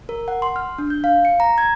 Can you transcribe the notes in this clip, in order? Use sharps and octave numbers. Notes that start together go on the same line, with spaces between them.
A#4
F#5
C6
F6
D4
G6
F5
C#7
A#5
G#6